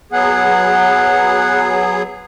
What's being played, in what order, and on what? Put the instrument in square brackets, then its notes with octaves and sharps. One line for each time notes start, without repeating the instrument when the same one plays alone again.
[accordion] F#3 B3 G#4 [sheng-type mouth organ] F#5